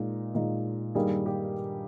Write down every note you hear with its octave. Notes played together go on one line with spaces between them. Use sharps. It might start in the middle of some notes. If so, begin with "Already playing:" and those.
Already playing: A#2 G#3 D#4
A#2 G#3 D#4
G2 D#3 G3 A#3 D#4 G#4
G4